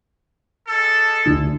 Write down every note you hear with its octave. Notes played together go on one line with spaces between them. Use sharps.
G#3 A4
D2 D3 D4